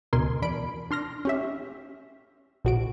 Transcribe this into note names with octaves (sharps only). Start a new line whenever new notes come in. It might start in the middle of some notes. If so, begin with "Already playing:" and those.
D2 B2 A#4 G#5 C6
E2 D4 B5 D7
D4 C6 F6 A#6
C#4 G4 E5
A#1 F#4 D7